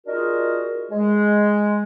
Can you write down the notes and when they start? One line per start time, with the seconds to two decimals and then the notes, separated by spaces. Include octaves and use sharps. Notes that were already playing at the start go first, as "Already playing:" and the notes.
0.07 D4 D#4 F4 F#4 G#4 A#4
0.92 G#3